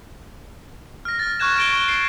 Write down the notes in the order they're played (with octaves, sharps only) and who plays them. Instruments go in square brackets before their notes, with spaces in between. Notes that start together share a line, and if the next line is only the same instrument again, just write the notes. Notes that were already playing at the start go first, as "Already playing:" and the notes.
[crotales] F6 A#6
F6 A6
C#6 F6 F#6 G#6 E7
F6 A6 D7 G7
C#6 G7
C7 D7